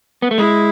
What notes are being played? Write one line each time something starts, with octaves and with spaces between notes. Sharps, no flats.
B3
A3
G#3 E4